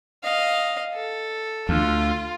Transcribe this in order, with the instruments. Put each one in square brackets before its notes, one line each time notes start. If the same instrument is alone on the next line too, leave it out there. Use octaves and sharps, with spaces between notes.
[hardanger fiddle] D#5 F5
A4
[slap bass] D2 [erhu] F4